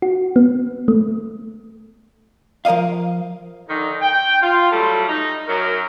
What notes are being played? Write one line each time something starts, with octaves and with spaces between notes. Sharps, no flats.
F#4
B3
A3
F3 A#4 C#5 D#5 F5
D3 D#3 D#4
G5
F4
F#3 G3 A3 A4
D#4
F#2 F#3 A#4